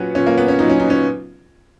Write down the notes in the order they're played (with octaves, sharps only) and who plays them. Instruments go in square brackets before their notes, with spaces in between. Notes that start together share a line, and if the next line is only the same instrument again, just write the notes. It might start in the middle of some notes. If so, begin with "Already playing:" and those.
Already playing: [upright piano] A#2 F#3 B3 C#4 F#4 G#4
A#2 F#3 C#4
A#3
B3
C#4
A#2 F#3 D#4
C#4
D#4
C#4